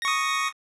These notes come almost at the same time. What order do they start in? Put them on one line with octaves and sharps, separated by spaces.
A#6 C#6 D#6